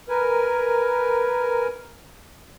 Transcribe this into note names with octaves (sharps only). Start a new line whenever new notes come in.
A#4 B4 G#5